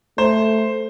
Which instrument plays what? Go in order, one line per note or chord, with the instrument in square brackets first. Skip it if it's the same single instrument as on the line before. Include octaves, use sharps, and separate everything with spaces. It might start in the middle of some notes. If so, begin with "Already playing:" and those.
[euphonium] A3 [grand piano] C5